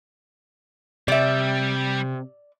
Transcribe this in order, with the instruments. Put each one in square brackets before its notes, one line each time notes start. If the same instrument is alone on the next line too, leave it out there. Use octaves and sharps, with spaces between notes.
[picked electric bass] C3 [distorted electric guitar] G3 [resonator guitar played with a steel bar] D5 E5